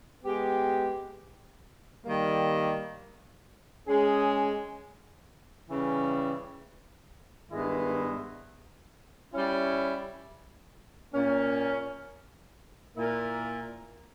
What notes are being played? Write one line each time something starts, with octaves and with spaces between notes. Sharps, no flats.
G#3 B3 G4
D#3 G3 A#3
G#3 C#4 G#4
C#3 E3 G3
G2 D#3 G#3 B3 E4
G3 C#4 E4
A#2 A#3 C#4
A#2 A#3 E4 A#4